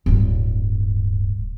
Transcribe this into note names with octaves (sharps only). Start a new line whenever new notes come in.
D1 G2